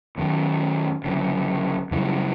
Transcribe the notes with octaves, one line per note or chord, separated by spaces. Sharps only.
F#2 D#3 F#3
F#1 F#2 D3
F#2 C#3 E3 G3